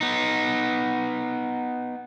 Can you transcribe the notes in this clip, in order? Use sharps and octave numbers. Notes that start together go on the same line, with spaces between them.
B3 D#4